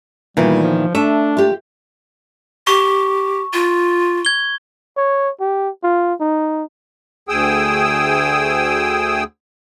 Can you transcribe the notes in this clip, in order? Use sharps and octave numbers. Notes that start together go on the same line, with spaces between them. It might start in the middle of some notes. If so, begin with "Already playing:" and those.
A#2 D#3 E3 G3 B3
F3
A3 D4 E5
F4 G4
G4 C#6
F4
G#6 G7
C#5
G4
F4
D#4
D2 G#4 G5 D#6 E6